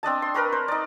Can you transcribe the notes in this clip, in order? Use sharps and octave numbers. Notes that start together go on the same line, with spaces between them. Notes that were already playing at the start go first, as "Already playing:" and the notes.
C4 D4 D#5 A5
C6
A#4 B4 A#5 C#6
C5
D#4 D5